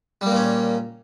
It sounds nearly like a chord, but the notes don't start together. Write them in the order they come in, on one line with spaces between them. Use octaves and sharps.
G3 A#3 A#2 C#4